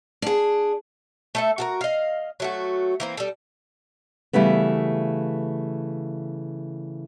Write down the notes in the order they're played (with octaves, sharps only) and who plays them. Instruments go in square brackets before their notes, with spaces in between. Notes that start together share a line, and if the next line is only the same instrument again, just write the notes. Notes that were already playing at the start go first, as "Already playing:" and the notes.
[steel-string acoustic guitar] D4 G#4
[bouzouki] A3 A4 E5
F#4 A4 A#4
D#5 F5
F#3 A3 F#4
E3 A#3 C4
G3 A4
[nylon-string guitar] C#3 E3 G3 A3 B3